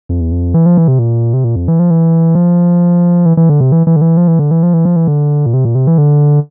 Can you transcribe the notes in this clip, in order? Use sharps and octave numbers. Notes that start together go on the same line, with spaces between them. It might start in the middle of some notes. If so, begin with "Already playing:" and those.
F2
E2
F2
E3
F3
E3
C3
A#2
C3
A#2
F2
E3
F3
E3
F3
E3
E3
D3
C3
E3
E3
D3
E3
F3
E3
D3
E3
F3
E3
F3
E3
D3
A#2
C3
A#2
C3
E3
D3